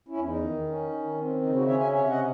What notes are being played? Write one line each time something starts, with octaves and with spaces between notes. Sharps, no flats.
C#4 E4
E2
D#4
D#3
C#4
D#3
C4
C#3 D#4
D#4 F#4
C#4 C#5 E5
E5 G#5
C3 C#5 E5
E5
D#5 F#5